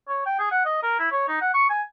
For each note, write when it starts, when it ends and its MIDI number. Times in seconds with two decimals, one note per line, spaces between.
0.08 0.24 73
0.26 0.37 79
0.39 0.50 68
0.51 0.65 78
0.66 0.81 75
0.83 0.96 70
0.99 1.10 64
1.12 1.24 73
1.28 1.40 63
1.42 1.54 78
1.54 1.70 85
1.70 1.82 80